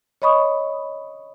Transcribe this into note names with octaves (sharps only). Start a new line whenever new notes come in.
C#5 D#5 B5 C#6 D#6